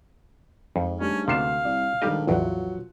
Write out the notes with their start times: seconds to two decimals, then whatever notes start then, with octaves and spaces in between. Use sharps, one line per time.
0.76 F2 G#2
1.00 G3 A3 C#4 D4
1.28 D2 C3 B3 D4 F5 C7 E7
1.65 C2 D5
2.02 G#2 D#3 G3 D4 G4 A4 D#5
2.27 A1 E2 F3 F#3 F#5